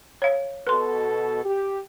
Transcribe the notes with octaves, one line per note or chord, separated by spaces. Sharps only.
C#5 F5
B2 A4 B4 C6
G4